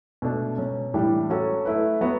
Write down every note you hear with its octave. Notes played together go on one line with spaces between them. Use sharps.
B2 A3 D4
B2 F#3 C#4
A2 E3 G3 D4 G4
F#3 C#4 F#4 A4
A3 E4 B4
F#3 B3 F#4 B4